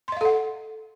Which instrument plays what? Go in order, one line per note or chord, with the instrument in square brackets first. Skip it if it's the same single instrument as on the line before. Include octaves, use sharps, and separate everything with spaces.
[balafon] C6
D#5
F5
A4
F#5